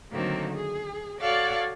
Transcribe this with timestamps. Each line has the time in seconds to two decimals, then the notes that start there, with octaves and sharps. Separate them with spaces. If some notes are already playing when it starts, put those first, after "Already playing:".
0.12 D3 D#3 F#3 A3 A#3 C4
0.53 G#4
1.20 F#4 A4 C#5 D5 F5 F#5